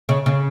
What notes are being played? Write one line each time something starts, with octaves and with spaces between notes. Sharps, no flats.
C#3
C#3